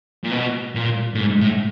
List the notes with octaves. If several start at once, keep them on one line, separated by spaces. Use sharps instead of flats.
A#2
B2
A#2
A2
G#2
A2